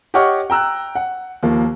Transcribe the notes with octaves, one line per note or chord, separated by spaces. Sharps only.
G4 C#5 D#5 F#5 C#6 F6
G5 A#5 E6 F#6
F#5
D#2 F3 A#3